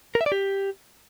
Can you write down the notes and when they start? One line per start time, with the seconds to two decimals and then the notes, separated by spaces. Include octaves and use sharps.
0.15 A#4
0.21 E5
0.26 D5
0.32 G4